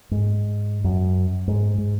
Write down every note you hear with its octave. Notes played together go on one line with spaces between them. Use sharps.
G#2
F#2
G#2
G#2